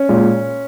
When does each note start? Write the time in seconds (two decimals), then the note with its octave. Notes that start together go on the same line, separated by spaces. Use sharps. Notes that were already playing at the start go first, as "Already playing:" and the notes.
Already playing: C#4
0.09 A#2 G#3